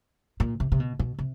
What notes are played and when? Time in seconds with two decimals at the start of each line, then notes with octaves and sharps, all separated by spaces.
0.40 A#2
0.60 C3
0.72 C3
0.80 B2
0.99 B2
1.19 C3